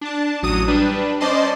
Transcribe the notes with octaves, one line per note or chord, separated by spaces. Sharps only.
D4 A5
A1 F#3 D#6 D#7
G3 D4 B4
C#4 C5 D5 D#5 A5 C6